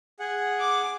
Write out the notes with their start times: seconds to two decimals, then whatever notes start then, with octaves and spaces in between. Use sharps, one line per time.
0.20 G#4 F#5
0.60 D6